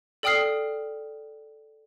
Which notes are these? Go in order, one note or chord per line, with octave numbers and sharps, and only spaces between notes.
A4 D5 G5 D#6 F6 C7